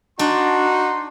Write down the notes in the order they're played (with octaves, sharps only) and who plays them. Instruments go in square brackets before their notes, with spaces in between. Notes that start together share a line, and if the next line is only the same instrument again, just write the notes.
[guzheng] D4 [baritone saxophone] D#4 [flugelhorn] F#4 [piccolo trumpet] C6